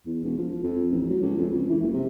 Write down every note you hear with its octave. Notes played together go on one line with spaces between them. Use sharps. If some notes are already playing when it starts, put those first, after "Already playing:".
E2
E1
F3
F2
A1
F#3
C#2
F2
C#2
E3
F#1
C3